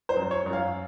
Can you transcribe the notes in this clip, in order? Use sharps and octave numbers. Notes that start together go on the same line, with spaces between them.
C5
F#2
C#5
F#2
F5